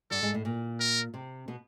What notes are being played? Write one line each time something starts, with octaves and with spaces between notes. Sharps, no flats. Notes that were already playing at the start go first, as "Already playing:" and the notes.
G2 G3 A4
G#2 G#3
A2 A3
A#2 A#3
A#4
C3 C4
B2 B3